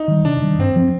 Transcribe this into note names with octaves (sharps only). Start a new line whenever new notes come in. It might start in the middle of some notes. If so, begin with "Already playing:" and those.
Already playing: D#4
D#3 G3
C3 D4
D#3 G3
G2 C4
F3 C4